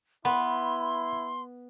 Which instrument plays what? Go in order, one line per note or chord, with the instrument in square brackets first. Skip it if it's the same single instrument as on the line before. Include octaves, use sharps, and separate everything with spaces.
[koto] B3 [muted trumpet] E4 [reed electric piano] B5 [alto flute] C6